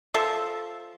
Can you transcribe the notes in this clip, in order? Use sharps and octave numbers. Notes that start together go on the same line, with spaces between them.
F3 F4 A4 E5